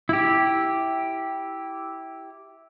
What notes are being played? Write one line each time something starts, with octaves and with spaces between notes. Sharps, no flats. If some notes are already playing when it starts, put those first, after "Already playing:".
E4 G4